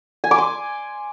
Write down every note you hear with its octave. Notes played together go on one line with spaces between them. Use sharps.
G#5
D6
C6